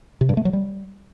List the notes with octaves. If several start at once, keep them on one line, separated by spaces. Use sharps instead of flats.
C3
G2
A3
F#3
G3